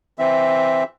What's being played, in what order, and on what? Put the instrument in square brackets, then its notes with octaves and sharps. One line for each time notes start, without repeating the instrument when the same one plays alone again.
[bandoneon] E3 C4 E5